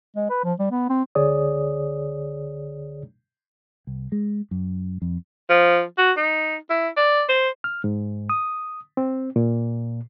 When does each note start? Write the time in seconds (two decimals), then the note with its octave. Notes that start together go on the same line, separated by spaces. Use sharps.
0.16 G#3
0.30 B4
0.44 F3
0.59 G3
0.71 B3
0.90 C4
1.15 C#2 D3 G#4 C#5 D5 D#6
3.87 C2
4.12 G#3
4.51 F#2
5.02 F2
5.50 F3
5.98 F#4
6.17 D#4
6.70 E4
6.97 D5
7.29 C5
7.64 F6
7.84 G#2
8.30 D#6
8.97 C4
9.36 A#2